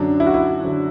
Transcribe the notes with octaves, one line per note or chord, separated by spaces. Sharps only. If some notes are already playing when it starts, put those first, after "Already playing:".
Already playing: F#2 D3 F#3 D4
E4
F#4
E4
D3 F#3